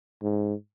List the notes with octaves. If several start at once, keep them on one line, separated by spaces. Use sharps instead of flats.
G#2